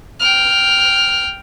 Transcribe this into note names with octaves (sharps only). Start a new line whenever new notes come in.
G5 F6